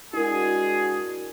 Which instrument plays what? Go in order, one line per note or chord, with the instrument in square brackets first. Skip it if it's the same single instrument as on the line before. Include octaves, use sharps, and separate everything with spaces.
[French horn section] G#3 D4 F#4 [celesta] E4 A#4 [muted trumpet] G#4